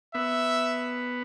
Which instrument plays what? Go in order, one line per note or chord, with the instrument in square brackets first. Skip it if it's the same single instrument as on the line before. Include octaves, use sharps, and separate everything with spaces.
[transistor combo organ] B3 [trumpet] E5